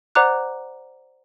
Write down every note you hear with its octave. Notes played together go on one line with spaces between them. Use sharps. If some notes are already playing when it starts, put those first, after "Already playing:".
C5 D5 F#5 A#5 D6 F#6